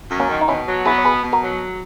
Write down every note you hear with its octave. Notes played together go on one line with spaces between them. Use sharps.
F#2
A#3 C#4
D#3
D#4
B2 C#4 E4
F#3
B3 E4 G#4
C#5
B2 G#4 B4
B2
F#4 A#4
F#3